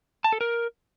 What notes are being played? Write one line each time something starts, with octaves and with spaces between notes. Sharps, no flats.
A5
A4
A#4